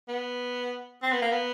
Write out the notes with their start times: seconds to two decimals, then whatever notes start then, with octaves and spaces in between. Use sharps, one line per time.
0.08 B3
1.03 C4
1.12 B3
1.22 A#3
1.32 B3